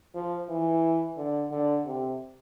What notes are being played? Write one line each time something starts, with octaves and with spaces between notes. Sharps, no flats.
F3
E3
D3
D3
C3